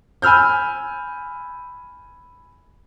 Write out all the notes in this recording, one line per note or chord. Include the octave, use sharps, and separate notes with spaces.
G#5 B5 E6 F6 G6